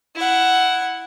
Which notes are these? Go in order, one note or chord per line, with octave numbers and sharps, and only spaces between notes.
E4 F#5